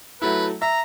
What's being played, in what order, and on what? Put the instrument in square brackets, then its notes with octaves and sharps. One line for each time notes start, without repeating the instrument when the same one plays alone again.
[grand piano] F#3 A3 E4 [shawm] B4
[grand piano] E5 [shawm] A#5